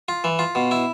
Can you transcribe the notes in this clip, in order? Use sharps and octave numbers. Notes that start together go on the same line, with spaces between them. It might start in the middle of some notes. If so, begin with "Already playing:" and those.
F4
E3
F4
B2
E4